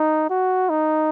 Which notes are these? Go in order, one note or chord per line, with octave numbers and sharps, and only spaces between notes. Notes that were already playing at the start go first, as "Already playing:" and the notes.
Already playing: D#4
F#4
D#4